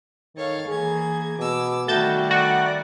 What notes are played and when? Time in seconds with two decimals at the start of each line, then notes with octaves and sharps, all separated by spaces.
0.36 D#3 A4 C#5 F5
0.68 E3 A#3 G#4 G#6
1.39 B2 D6 E6
1.88 D#3 G3 A3 F#4 A5 G6 A6
2.31 F#4 D5 F#5